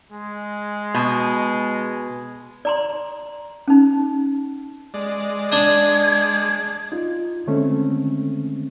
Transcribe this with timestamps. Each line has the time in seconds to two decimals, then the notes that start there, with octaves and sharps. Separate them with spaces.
0.12 G#3
0.94 B2
2.65 D5 A#5 C6
3.68 C#4 D#4
4.94 G#3 D5
5.52 D4 D#6 G#6
6.92 D#4 F4
7.47 D3 D#3 G#3 A3 C4 C#4